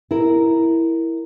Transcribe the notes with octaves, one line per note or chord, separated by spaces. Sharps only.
E4 A#4